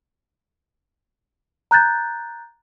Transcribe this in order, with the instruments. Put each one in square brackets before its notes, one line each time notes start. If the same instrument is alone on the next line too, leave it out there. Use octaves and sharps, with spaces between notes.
[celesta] A#5 F#6 G6 A6